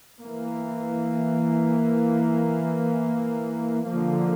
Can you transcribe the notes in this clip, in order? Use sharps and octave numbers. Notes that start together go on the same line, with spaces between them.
E3 A#3
D3 F3 A#3